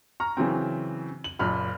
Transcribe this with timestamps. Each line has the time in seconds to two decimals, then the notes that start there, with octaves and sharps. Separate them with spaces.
0.20 A#5 C#6 F6
0.37 C#3 E3 F#3 C4
1.24 F#7
1.39 F#1 A#2 B5 F6